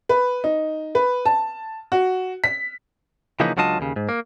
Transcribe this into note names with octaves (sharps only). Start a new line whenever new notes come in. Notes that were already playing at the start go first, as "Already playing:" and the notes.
B4
D#4
B4
A5
F#4
B6
C#3 E3 F3 A#3 D#4 B4
C#2 F#3 D4 F4 D#5 A5
D#2 C#3
G#2
A#3